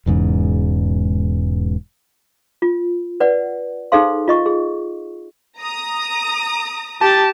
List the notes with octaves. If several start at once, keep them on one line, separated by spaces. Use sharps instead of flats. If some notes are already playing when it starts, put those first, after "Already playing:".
E1 E2 G#2 C#3
F4
B4 D5 F#5
D#4 G#4 A4 C5 F5 C6
F4 D#5 C#6
G#4
A#5 D#6
G4 A5